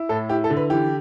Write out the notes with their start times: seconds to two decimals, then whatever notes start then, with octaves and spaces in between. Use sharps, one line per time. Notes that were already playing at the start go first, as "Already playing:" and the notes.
Already playing: E4
0.09 A2 A4
0.29 E4 G4
0.44 A4
0.50 D3
0.57 B4
0.70 E3 G4